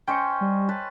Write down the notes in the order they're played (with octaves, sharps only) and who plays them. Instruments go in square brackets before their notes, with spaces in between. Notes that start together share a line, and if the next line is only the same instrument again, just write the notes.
[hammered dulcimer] C#4 C5 D#5 [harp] G5 C#7
[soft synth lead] G3
[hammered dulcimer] B4 C#5 A5